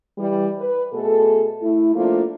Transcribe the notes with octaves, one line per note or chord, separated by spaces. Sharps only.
E3 G3
B4
B2 A3 G#4 A4
A3 E4
F3 A3 A#3 D4 F4